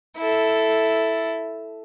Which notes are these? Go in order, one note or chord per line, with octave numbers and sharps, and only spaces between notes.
E4 A4